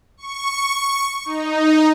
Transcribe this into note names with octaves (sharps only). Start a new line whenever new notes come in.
C#6
D#4